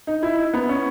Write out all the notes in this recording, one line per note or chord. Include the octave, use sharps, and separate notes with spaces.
D#4
E4
B3
C#4